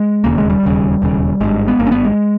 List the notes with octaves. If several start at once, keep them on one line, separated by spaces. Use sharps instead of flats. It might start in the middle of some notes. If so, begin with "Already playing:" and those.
Already playing: G#3
E1 D#2 C#3 A#3
G#3
G3
E1 D#2 C#3
E1 D#2 C#3
G#1 G2 G#3
B3
G#1 G2 A#3
C#4
B3
G#3